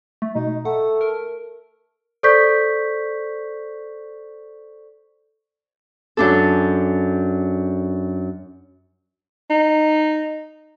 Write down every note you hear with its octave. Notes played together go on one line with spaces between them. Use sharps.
A3
B2 D#4
A3 F#5
A#4
A4 C5 D5 C#6 G6 B6
F#2 D4 A4
D#4